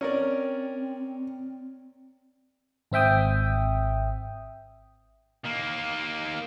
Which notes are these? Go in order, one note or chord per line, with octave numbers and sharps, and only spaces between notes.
C4 C#4 A#4 D5
G#1 C4 E5 G5 D#6
D#3 A#3